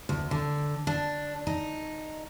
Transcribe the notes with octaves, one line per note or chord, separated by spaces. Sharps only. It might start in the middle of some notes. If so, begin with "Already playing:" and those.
D2
D3
D4
D#4